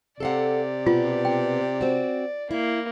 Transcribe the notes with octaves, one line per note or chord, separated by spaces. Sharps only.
C3 A4 D5 F5 F#5
B2 B3 F4
G5
C4 F#4
A#3 E4